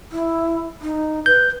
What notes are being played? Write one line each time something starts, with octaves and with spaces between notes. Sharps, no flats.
E4
D#4
B4 G6